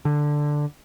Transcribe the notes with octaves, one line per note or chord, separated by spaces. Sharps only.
D3